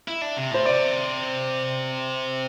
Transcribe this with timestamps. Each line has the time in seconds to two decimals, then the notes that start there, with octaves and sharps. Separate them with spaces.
0.08 E4 E5
0.22 D4
0.37 C3
0.51 A2 C5
0.65 C3 D5